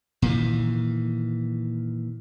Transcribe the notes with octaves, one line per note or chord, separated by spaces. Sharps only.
A#2 D#3 E3